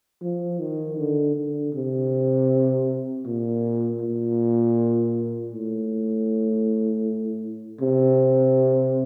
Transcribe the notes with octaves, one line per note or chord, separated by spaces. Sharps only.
F3
D#3
D3
D3
C3
A#2
A#2
A2
C3